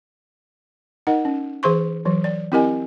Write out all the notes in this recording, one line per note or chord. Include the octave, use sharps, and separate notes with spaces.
D#4 A#4 D#5 F#5
C#4
E3 G#4 C5 C6 C#6
E3 F#3
D5
C4 E4 G4 A#4 D#5 G#5